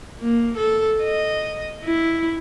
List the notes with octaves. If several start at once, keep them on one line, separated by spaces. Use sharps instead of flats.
A#3
A4
D#5
E4